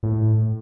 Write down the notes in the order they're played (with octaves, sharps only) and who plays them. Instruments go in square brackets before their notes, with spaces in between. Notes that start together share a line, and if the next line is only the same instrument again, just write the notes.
[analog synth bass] A2